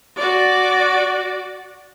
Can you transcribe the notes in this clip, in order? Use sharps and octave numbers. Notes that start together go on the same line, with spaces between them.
F#4 D5